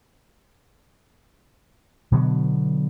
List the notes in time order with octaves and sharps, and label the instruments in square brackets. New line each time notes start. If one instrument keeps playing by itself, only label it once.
[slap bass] B2 D3 F#3 B3